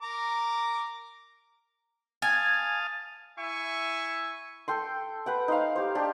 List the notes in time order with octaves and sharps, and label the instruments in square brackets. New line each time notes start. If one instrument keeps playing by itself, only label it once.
[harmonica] A#4 A#5 D6
[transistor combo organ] F5 A5 D#6 [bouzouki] G#5
[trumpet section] E4 E5 G#5 C#6
[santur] A4 G5 C6
B4 F#5 G5
D#4 C5 F5
G4 C5
D4 G4 C5